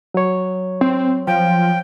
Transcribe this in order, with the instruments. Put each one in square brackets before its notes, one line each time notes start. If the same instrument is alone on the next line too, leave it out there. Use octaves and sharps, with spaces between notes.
[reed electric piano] F#3 C#5
[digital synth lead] C4
[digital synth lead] F3 [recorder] G5